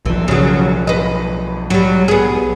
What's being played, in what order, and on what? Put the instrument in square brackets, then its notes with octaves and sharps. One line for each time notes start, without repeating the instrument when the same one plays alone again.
[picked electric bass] B1 F3 [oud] E3
[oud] C#3 F#3
B4 D#5
F#3 G3
B3 G#4